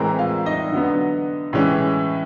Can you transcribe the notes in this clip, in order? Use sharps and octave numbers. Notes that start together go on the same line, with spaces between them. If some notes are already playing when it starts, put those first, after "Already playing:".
Already playing: A2 E3 G#3 C4 A#4 A#5
F4 F5
D#4 D#5
D3 F#3 B3
A2 E3 G#3 C#4